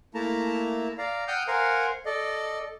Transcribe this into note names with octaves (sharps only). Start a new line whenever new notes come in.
A3 A#3 E4 A5 A#5
D5 F5 A#5
F#5 G5 D#6 F6 G6
A#4 C5 F5 F#5 G#5 A#5
A4 D5 D#5